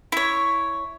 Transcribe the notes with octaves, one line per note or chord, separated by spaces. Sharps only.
E4 C#5